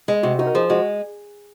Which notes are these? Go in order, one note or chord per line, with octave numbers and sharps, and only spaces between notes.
G#3 G#4
C3 F#4
D#4 F#4
A#4
F3 G#4
G#3 F#4